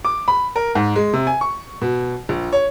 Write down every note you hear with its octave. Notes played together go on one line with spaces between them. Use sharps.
D6
B5
A#4
G#2
G#3
C3
G#5
C#6
B2
A#1
C#5